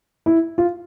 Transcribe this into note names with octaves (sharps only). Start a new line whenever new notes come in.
E4
F4